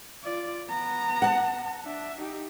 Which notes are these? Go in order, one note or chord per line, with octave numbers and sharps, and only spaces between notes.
F4 D5
B3 A#5
F#5 A5
D4 E5
D#4 G4